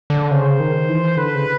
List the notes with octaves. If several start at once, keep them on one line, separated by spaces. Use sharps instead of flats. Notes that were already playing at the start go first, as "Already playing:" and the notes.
D3
C#3 C5
D#3
E3
D3 B4
C#3